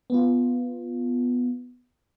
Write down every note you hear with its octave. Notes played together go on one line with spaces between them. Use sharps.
B3 F4